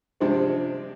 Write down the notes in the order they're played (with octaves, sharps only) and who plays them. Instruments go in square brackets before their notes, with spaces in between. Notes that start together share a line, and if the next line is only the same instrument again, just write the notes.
[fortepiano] C3 F3 G#3 C4 D4